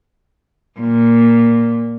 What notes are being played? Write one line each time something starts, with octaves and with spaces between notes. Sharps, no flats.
A#2